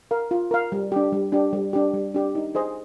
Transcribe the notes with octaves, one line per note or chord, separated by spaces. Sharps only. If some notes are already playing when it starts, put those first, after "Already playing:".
A#4 F5
F4
A#4 F5
G3
D4 G4
G3
D4 G4
G3
D4 G4
G3
D4 G4
D#4
G#4 C5 D#5